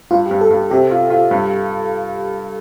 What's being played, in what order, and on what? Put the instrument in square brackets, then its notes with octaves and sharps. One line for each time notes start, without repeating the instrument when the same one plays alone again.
[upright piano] G2 [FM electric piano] F4
[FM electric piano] G4
[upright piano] G2
[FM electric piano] A4
[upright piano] G2
[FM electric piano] G4
[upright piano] C3 [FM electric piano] G4
[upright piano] F4
F4
G2